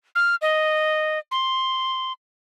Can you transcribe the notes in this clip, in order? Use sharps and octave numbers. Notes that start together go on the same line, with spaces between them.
F6
D#5
C6